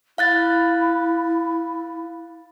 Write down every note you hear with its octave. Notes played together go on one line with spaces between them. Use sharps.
E4 F5 F#6 A6